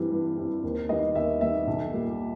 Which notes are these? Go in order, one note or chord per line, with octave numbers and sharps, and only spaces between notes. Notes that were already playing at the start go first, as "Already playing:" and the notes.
Already playing: G2 E3 G3 C4
G2
E3 G3 C4
D#2
D#3 G3 B3 D#5
D#2 E5
D#3 G3 B3 E5
B1
A#2 G3 A#3